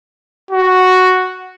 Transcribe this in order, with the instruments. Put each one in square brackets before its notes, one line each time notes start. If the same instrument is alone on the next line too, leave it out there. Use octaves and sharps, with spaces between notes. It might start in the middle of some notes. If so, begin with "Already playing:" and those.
[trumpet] F#4